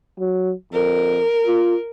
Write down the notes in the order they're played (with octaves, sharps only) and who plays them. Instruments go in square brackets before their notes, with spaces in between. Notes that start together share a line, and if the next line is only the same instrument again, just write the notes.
[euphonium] F#3
[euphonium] F2 [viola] A#4
[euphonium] F4